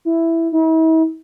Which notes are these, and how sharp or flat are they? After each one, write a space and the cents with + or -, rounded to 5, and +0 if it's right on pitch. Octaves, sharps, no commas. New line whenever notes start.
E4 +5
E4 -45